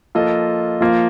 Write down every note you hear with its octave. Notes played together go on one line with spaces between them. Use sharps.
F3 A#3 F4 A4 D#5
F3 A#3 F4